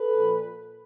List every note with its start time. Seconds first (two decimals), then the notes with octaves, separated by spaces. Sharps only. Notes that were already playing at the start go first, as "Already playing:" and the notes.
Already playing: A4 B4
0.14 A#2 F3